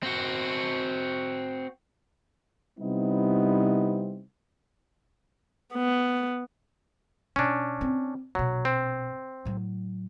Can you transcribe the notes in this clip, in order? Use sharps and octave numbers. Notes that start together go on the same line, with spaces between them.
C4 F#4
C3 G3 B3 C4 D#4 E4
B3
B2 C#4 D4
C4
A#1 B2 F#3
C4
A2 F#3